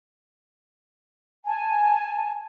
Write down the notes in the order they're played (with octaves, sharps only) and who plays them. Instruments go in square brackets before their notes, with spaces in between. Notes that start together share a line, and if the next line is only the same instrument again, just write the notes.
[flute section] G#5 A5